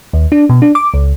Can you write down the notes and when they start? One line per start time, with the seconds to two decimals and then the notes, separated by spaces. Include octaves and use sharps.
0.13 D#2
0.32 D4
0.50 B2
0.62 D4
0.75 D6
0.94 C#2